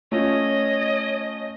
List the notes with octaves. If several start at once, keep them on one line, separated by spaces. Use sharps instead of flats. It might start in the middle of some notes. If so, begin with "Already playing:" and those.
A3 C#4 F4 C#5 D#5